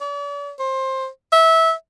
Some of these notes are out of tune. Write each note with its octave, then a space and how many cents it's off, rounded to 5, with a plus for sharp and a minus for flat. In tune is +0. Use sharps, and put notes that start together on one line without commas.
D5 -45
C5 +20
E5 -20